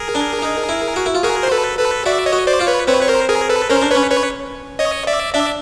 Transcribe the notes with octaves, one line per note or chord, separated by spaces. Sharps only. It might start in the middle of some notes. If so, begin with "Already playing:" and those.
Already playing: G#4 A#4
D4
D#4
E4
F#4
E4
F4
F#4 G#4 A#4
C5
A4 B4
A4 B4
F#4 D5 E5
C#5 D#5
F#4
C5 D5
F4
B4 C#5
C4 B4 C#5
C#5
A#4 C5
G#4 A#4
A4 B4
C#4 A#4 C5
D4
C#4 B4 C#5
B4 C#5
C#5 D#5
D5 E5
D4 D5 E5